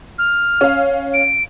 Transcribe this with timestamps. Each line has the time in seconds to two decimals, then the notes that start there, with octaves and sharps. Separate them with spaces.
0.18 F6
0.61 C#4 F5
1.14 D7